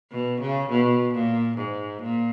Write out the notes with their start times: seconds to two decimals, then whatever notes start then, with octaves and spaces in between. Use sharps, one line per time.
0.12 B2
0.41 C#3
0.70 B2
1.14 A#2
1.58 G#2
2.02 A#2